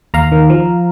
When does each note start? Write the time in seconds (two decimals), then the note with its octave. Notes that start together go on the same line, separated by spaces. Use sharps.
0.14 D#2 F5 A#5
0.32 D#3
0.50 F3